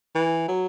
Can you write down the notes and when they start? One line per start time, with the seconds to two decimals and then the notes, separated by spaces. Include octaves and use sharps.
0.15 E3
0.48 F#3